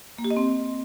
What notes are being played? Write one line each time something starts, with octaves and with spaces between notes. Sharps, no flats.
A#3
G4
D#5
C4